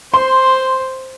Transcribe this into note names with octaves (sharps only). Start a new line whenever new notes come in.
C5 C6